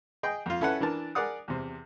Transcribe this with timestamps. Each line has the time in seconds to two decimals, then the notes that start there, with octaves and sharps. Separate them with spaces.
0.23 G#4 D#5 G5
0.46 F2 F4
0.61 C#4 E4 A4 B4 F#5
0.80 E3 D4 A#4 A5
1.15 G#4 A#4 D5 F#5 D#6
1.48 E2 C3